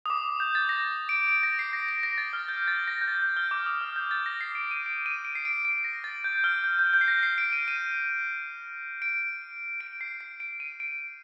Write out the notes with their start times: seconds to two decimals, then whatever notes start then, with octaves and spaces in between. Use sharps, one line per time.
0.06 D#6
0.10 D6
0.40 G6
0.55 A6
0.69 A#6
1.09 D7
1.28 D7
1.43 A#6
1.59 C7
1.73 A#6
1.88 A#6
2.03 A#6
2.18 A6
2.33 F6
2.48 G6
2.68 A6
2.87 A#6
3.01 G6
3.08 A6
3.22 G6
3.36 F6
3.51 D6
3.66 D#6
3.81 F6
3.96 G6
4.11 A6
4.26 A#6
4.41 C7
4.55 D7
4.71 D#7
4.86 D7
5.06 D#7
5.25 D7
5.35 C7
5.45 D7
5.65 D7
5.84 A#6
6.04 A6
6.24 G6
6.44 F6
6.64 G6
6.79 G6
6.94 G6
7.01 C7
7.08 A#6
7.23 C7
7.38 D7
7.53 D#7
7.68 D#7
9.02 D7
9.81 D7
10.01 C7
10.21 C7
10.40 D7
10.60 D#7
10.80 D7